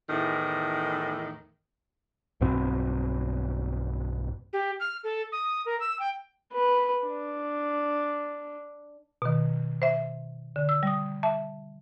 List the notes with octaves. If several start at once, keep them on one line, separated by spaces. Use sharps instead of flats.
E2 A2 D#3 E3 A3
B1 G2 B2 C4
G4
F6
A4
D#6
A#4
E6
G5
B4
D4
B2 D#3
C5 E5
D3
E6
G3 D#6
E5 A5